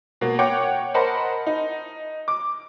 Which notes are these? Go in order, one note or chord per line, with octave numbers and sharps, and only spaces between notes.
B2 A#3
C#5 F#5 G5 D6
A#4 C5 D#5 F#5 A5 B5
D#4
D6